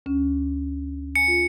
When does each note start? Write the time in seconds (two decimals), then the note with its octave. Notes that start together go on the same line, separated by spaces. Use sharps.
0.06 D2 C#4
1.16 G#5 C#7
1.28 F4